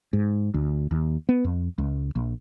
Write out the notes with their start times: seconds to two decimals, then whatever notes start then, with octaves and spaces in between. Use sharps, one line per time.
0.13 G#2
0.54 D2
0.91 D#2
1.29 B3
1.44 F2
1.78 C#2
2.15 A#1